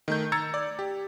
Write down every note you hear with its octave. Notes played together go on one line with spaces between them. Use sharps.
D#3 A3 G6
A#5 E6 G#6 A6 C#7
D5
G4